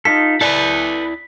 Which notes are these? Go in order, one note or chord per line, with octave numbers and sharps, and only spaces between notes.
D#4 F4 A4 B6
E4 A4 B4 D5